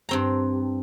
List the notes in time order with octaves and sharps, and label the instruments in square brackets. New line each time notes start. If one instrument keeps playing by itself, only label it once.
[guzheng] G2 C4 A#5